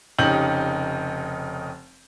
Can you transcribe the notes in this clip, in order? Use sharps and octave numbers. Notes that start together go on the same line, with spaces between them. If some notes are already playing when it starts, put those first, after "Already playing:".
F1 C#3 D#4 G4 G6 F#7